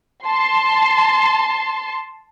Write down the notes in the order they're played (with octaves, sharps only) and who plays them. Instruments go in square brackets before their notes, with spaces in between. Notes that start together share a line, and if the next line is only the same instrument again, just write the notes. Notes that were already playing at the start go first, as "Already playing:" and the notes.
[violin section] A5 C6